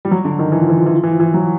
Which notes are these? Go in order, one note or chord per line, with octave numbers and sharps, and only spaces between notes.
G3
F#3
D3
D#3
E3
F3
E3
F3
E3
F3
E3
F3
E3
F#3